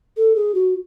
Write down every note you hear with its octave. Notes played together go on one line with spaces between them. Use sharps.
A4
G#4
F#4